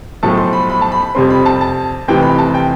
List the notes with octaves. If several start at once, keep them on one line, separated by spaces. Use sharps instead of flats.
B1 A2 F3 A3 A5
C6
B5
B5
A5
B5
B5
F2 C3 G3 C4 C6
B5
A5
A5
F1 F2 C3 E3 G5
B5
A5
G5